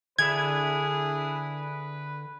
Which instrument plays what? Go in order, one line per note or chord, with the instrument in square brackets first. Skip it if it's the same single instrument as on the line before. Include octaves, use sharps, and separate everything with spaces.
[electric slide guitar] D3 E5 [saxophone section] D4 E4 G#4 [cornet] B4 [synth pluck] G#6